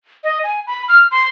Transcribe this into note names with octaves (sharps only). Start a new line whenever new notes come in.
D#5
G#5
B5
F6
C6